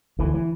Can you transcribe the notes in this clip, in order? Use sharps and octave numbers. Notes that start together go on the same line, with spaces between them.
D2 E3
E3